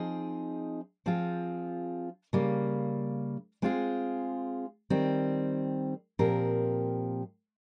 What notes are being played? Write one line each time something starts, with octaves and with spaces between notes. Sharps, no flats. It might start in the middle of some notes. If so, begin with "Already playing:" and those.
Already playing: F3 C4 D#4 G#4
F3 C4 F4 G#4
C#3 G3 A#3
G#3 C4 F4 G#4
D#3 G3 C4
A#2 F3 C4 G4 A#4